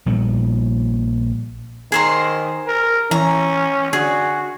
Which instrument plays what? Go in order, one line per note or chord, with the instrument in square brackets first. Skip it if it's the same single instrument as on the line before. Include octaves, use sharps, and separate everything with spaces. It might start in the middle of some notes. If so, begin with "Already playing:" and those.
[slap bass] A#1 A#2 G3 B3
[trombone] D#3 [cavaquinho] G#4 C5 A#5
[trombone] A#4
[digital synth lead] E3 [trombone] C#4 [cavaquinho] A#5
[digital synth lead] D3 [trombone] F#4 [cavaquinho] G#4